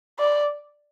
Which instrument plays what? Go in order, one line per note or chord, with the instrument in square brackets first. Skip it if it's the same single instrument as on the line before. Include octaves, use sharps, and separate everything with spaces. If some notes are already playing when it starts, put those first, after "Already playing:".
[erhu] D5